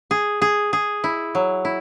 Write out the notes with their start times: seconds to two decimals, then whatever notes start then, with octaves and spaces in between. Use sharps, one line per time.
0.11 G#4
0.42 G#4
0.73 G#4
1.04 E4
1.35 F#3
1.65 E4